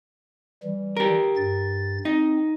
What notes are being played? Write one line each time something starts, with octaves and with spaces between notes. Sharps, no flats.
E3 G3
G4 A#4
G2 A6
C4 D#4